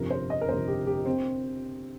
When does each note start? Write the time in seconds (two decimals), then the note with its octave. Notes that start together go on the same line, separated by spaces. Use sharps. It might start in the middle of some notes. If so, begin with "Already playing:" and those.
Already playing: G1 F2 C3 A#4
0.11 C5
0.30 D#5
0.41 A#4
0.48 G1 F2 C3 C5
0.68 G4
0.87 G4
1.06 C4